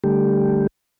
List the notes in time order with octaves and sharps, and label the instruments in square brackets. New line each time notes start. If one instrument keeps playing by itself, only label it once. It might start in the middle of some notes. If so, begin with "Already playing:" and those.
[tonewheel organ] D3 G3 A3 G4